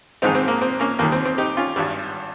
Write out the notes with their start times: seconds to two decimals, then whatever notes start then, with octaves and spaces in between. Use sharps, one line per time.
0.22 A#1 G#2 D#3 G#3 C4 D#4
0.35 C4
0.48 A#3
0.62 C4
0.80 A#3 C#4
0.99 D#2 D#3 G3 A#3
1.12 C4
1.25 C4
1.38 D#4 G4
1.57 C#4 F4
1.76 G#1 G2 G3